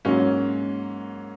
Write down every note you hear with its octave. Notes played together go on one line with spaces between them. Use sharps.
G#2 F#3 A#3 C#4